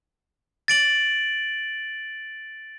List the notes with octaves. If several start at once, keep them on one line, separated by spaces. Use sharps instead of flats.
A6 D7 F#7